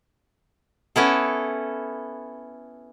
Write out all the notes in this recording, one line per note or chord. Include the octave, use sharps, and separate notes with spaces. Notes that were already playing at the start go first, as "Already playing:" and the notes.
B3 C#4 E4 A4